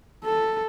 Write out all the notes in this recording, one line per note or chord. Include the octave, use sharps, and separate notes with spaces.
A4